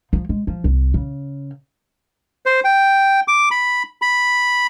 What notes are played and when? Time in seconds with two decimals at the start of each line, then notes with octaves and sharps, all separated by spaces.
0.13 F3
0.29 G#3
0.47 F3
0.64 C2
0.94 C#3
2.46 C5
2.64 G5
3.28 D6
3.51 B5
4.02 B5